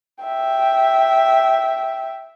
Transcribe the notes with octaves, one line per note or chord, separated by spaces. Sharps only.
E5 G5